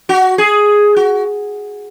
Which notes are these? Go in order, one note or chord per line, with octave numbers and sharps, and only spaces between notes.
F#4
G#4
F#4